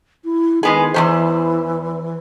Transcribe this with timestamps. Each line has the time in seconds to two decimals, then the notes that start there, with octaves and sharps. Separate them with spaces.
0.24 E4
0.63 D#3 G#3 B3 G#4
0.94 E2 D#3 E3 C5